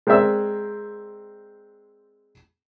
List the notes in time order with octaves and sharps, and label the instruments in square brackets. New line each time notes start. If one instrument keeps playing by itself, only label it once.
[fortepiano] G#3 C4 A#4 D5 E5 E6